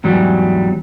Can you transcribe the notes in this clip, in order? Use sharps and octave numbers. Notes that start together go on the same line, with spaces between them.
E2 G#2 F#3 G3